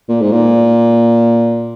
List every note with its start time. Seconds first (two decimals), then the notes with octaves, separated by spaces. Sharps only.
0.09 A#2
0.21 G#2
0.32 A#2